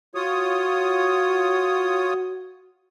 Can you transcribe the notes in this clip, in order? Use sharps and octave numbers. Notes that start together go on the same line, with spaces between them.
F4 F#4 C#5 D#6